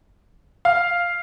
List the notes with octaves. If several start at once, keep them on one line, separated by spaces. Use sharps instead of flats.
F5